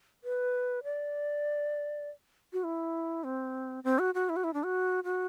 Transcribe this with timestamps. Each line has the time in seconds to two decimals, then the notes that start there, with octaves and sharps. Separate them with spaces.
0.24 B4
0.84 D5
2.53 F#4
2.64 E4
3.24 C4
3.84 C4
3.99 F#4
4.15 F#4
4.29 E4
4.36 F#4
4.44 E4
4.54 D4
4.64 F#4
5.04 F#4